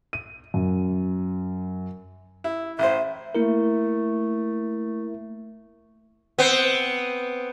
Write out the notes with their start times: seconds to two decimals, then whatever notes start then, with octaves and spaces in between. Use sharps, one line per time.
0.13 D#7
0.54 F#2
2.44 E4
2.79 A1 C5 E5
3.35 A3 A#3 E4 A#4
6.38 B3 C4